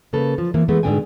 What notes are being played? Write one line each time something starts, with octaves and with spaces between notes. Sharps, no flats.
C#3 A#3 A4 B4
F3
E3 A#3 C4
E3 G#3 A3 B3
G#2 B2 D3 D4 G5 G#5